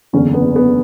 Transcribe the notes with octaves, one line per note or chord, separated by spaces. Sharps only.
F#1 E2 D3 C#4
B3
B3